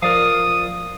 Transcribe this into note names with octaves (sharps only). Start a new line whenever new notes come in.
F3 A#4 D5 F5 D#6